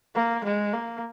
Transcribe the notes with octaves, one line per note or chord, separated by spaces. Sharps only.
A#3
G#3
A#3